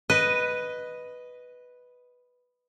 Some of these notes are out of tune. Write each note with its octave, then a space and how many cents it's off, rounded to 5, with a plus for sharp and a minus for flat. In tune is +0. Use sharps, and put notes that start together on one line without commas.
B4 +0 D#5 +0